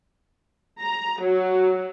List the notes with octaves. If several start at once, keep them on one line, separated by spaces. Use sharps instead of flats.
A#5
F#3